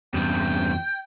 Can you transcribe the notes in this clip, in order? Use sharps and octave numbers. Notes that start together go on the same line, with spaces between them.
E2 G2 G5